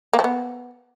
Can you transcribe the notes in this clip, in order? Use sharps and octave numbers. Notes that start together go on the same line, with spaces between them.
A#3
F3
B3